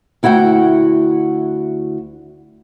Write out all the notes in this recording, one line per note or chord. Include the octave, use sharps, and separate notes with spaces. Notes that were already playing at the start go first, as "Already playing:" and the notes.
D2 E4 F#4 F#5 G5